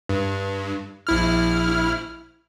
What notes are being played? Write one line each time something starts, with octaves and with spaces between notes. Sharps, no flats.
G2
A#1 E4 F6